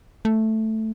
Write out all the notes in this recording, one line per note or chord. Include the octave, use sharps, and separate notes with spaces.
A3